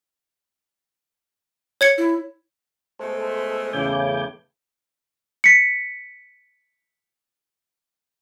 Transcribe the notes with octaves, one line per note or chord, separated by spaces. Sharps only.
C#5 G#6 C#7
E4
B2 G#3 A3 A4 C5
E2 A2 C#3 G#5 D6 G6
B6 C#7